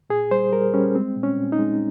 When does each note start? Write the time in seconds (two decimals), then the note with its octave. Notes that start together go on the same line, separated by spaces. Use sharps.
0.10 A#2 G#4
0.31 G3 C5
0.52 G3 A#4
0.74 G3 C#4
0.95 G#3 C4
1.16 A#2
1.23 C#4
1.38 A#2
1.52 D#4
1.59 G#3